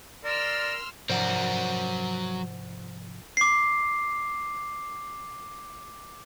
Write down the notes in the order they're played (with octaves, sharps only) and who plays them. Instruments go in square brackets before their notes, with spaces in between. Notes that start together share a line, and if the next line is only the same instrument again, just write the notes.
[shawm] A#4 [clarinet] D5 [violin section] C6 E6 F6
[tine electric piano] G#2 C3 F3 [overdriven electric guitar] F#3 A#4 [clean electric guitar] C5 D5 F#5
[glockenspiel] D6 C7